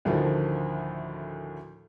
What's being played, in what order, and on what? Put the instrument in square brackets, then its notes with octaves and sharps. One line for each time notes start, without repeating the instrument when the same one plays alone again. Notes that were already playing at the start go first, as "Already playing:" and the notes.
[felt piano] D2 A2 D3 D#3 F3